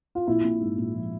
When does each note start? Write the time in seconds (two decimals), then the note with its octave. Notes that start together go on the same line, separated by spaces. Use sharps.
0.15 F4
0.27 A#1 E4
0.44 A#1
0.61 G#2
0.77 A#1
0.95 F3